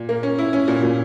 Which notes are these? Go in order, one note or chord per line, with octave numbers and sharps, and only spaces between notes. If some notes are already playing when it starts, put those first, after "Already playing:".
Already playing: A#2
A#3
C#4
E4
C#4
A#2
A#2